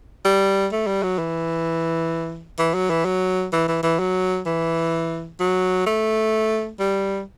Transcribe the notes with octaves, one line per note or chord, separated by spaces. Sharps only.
G3
A3
G3
F#3
E3
E3
F#3
E3
F#3
E3
E3
E3
F#3
E3
F#3
A3
G3